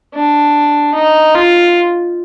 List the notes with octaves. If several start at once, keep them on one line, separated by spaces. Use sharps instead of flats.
D4
D#4
F4